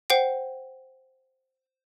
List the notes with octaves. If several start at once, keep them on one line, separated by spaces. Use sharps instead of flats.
C5 F#5 G5 C7